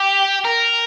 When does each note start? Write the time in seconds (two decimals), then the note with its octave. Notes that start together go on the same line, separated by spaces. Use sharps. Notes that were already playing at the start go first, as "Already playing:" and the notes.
Already playing: G4
0.45 A#4